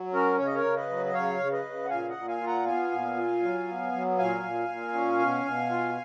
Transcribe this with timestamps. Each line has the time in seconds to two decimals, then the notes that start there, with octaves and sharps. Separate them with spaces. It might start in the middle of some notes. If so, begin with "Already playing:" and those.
Already playing: F#3
0.13 C#4 F#4 A#4
0.38 C#3 C#5
0.47 D#5
0.55 A#4 C#5
0.64 C#3
0.76 B4 D#5
0.90 F#3
1.06 D#5
1.14 C#3 C#5 F5
1.39 C#3
1.52 B4 D#5
1.65 C#3
1.85 F#5
1.90 A#2 F5 G#5
2.09 D#5 F#5
2.15 A#2
2.28 F5 G#5
2.41 F4
2.47 F#5 A#5
2.66 B3 F5 G#5
2.92 A#2
3.17 F4
3.42 F#3
3.67 B3
3.92 F#3
4.18 A#2 F5 G#5
4.43 A#2
4.68 A#2
4.94 C#4
5.19 B2
5.45 B2
5.70 F4